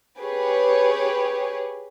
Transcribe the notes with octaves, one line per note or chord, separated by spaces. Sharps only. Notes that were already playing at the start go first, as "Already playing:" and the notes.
G4 G#4 B4 C#5